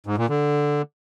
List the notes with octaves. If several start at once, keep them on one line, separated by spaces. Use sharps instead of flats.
G#2
A#2
D3